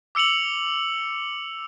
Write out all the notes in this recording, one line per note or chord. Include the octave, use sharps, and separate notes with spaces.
D6 E6 C#7 F7 F#7